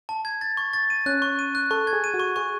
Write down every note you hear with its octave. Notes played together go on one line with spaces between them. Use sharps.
A5
G#6
A6
C#6
A6
D#7
C#4 F#6
C#6
D#7
F#6
A4 C#6
G#6
G#4
D#7
F#4
C#6
G#4 C#6